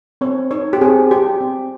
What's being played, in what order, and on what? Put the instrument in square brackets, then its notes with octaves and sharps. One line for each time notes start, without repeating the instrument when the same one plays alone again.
[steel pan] C4 C#5
D#4 C#5
G4
C4 G#4
G4
C4